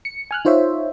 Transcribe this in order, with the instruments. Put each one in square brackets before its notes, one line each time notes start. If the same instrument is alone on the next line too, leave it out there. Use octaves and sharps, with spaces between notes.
[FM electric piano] C#7
G#5 F6 F#6
D#4 F4 C5 C#5 E5